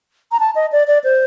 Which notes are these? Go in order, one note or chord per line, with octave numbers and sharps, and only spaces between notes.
A#5
A5
D#5
D5
D5
C5